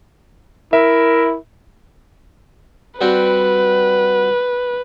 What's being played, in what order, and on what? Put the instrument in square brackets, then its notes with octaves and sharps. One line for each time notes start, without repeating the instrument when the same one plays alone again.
[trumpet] E4 [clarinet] A#4 [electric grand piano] E5
[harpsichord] G3 C4 F#4 [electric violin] B4